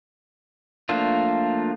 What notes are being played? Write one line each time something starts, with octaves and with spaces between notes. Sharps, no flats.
F3 A3 A#3 D4 F4